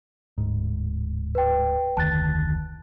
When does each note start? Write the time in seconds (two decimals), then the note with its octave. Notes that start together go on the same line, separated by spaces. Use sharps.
0.38 D1 G#2
1.35 B4 G5
1.97 F1 D2 D#3 A5 F#6 A6